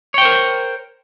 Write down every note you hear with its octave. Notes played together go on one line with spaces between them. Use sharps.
A#4 C5 C#5 G5